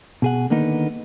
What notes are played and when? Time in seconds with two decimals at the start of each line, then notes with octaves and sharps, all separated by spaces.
0.22 B2 G#4 F#5
0.50 D3 D#3 A#3 B3 D#4